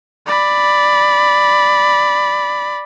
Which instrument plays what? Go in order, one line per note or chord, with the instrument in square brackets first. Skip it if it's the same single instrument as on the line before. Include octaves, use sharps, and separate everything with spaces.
[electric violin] D5 B5